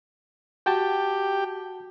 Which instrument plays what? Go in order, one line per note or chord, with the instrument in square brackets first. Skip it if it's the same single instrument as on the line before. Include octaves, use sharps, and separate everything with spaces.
[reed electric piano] F#4 G5 A5 [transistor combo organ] G4